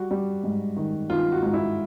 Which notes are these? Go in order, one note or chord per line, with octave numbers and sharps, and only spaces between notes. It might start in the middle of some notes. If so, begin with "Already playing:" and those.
Already playing: G3 F#4
G3
G#2
D#3
D#3 F4
F#4
G#2
E4